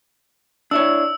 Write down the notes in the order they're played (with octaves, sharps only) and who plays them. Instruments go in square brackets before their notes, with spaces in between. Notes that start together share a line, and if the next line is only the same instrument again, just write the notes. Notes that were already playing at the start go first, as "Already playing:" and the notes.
[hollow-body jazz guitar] D4 E4 C#5 [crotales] E6